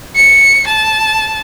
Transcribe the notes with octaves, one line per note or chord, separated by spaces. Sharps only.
C#7
A5